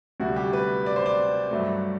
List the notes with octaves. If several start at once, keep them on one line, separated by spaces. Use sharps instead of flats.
D2 C3 G3 F#4
G4
B4
D5
C5
D5
G2 F#3 A3